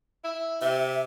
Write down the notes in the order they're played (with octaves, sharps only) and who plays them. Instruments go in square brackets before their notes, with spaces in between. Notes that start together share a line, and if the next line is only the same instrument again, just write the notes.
[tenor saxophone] E4
[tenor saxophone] C3 [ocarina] E5